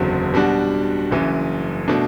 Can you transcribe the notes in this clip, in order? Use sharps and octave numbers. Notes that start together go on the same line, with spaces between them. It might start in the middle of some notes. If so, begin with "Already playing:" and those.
Already playing: F#1 E2 D3 F#3 C4
B2 G3 D4 F#4
F#1 F#2 E3
B2 A3 D4